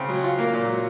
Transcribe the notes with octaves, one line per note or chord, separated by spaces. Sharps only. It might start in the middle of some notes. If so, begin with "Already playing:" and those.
Already playing: C#3 C4
F#3
F4
A#3
A#2
F#3